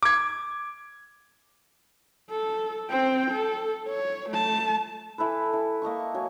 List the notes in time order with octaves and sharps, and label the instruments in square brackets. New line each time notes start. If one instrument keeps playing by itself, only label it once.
[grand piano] D6 G#6
[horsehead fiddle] A4
C4 G5
A4
C#5
A3 A5
[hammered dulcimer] E3 E4 A4 B4
E3
A#3 D#5 A5 C#6
F#3 G#5